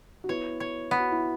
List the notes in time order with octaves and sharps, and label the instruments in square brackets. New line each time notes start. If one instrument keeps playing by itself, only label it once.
[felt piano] F#4
[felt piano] B3 E4 [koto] C#5
[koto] C#5
B3
[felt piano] F#4
E4